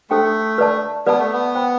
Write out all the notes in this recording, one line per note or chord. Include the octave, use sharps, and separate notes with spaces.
A3 D4 A4 C5 G5 C6
B4 D5 A5
B3 B4 D5 A5
A3
B3
C5 G5 B5